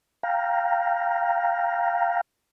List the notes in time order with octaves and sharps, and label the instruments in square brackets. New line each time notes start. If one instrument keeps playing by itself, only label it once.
[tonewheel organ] F5 G5 A#5